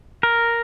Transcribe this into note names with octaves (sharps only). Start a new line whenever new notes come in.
A#4